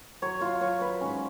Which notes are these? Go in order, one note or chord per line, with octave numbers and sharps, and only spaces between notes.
F#3 C#5
F4
F#3 C#5
B4
G#2 C#4